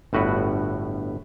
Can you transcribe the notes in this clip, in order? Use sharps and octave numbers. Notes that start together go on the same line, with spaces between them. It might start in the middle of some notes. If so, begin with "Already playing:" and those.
G1 A2 F#4 B4